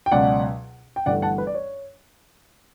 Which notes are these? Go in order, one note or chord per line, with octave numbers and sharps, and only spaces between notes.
G5
C#2 B2 F#3 D5 F#5
G5
G1 G2 E3 A3 D5 F#5
F#5 A5
B4
D5
C#5